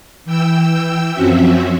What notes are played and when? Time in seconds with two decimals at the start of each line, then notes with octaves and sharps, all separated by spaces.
0.25 E3 G5 E6
1.13 F#2 F3 C4 C#4 F#4 E5